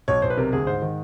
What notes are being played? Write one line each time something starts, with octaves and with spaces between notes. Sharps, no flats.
B1 C#5
B1 C5
B4
C3 A#4
D2 G#4
G#2 C5
D#3